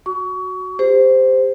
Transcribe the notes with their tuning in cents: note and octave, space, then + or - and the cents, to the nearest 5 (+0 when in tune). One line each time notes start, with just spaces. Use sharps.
F#4 +0 C#6 +30
G4 +30 C5 -15